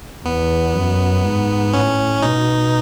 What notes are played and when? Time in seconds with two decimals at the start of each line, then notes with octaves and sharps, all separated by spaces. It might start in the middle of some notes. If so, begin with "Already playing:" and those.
0.25 E2 B3
0.74 F#2
1.25 G#2
1.73 A2 C#4
2.22 B2 D#4